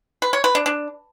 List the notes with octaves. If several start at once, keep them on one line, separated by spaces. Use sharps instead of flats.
B4
C#5
B4
D4
D4